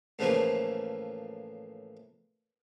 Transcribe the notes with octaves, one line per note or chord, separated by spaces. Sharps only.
A2 C#3 E3 F3 A3 A#3